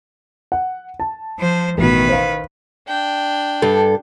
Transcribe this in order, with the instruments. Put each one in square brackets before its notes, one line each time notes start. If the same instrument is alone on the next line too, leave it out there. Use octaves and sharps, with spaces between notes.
[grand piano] F#5
A5
[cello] F3 C5
[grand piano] A1 B2 [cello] D#3 B4
[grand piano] C5 F5
[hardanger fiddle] D4 G5
[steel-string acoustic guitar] G2 A4